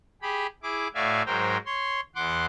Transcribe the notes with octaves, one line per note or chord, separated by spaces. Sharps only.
G4 G#4 B5
E4 G#4 D6
A2 F#4 D5 E5 F5 G#5
G#2 F#3 A#4 C5 G5
C#5 C6
E2 F#5 C6 D6